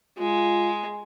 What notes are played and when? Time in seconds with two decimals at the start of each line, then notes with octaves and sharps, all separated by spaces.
0.19 G#3 F4